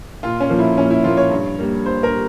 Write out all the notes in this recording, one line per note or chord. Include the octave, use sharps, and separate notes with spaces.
A#2 F4
C#4
F3 A#3
E4
A#2 C#4
E4
F3 A#3 F4
C#5
G2
G3 A#3
G2 C5
A#4
G3